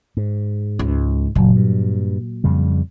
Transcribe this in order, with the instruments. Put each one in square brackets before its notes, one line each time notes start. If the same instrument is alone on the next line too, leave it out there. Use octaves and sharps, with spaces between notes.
[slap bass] G#2
[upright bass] C#2
[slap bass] F#1 [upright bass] A#2 F#3
[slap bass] G2
F2 C#3 G3